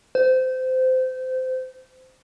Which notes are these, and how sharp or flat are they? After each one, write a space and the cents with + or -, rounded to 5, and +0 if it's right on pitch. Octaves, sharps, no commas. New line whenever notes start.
C5 -25